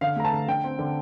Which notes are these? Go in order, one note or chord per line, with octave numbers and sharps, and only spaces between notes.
D3 F5
A3 A#5
A5
D3
D3 G5
C4
D3